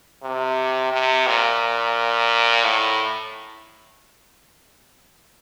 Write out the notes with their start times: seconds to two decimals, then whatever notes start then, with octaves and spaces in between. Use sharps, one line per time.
0.23 C3
0.92 C3
1.27 A#2
2.65 A2